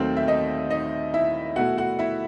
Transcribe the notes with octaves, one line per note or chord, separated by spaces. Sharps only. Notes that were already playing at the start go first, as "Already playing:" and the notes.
Already playing: D#2 D#3 F#3 A3 C4 C5
E5
D#4 D#5
D#4 D#5
E4 E5
B2 A3 E4 F#4 F#5
F#4 F#5
E4 E5